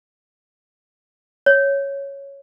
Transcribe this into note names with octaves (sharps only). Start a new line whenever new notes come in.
C#5